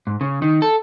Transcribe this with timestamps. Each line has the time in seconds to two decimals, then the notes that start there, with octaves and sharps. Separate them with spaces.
0.07 G#2
0.21 C#3
0.42 D#3
0.62 A4